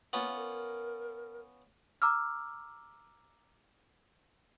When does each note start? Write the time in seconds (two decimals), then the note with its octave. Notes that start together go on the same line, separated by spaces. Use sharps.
0.13 A#3 B3 C#4 F4
0.35 A#4
2.02 A#5 D6 E6 F6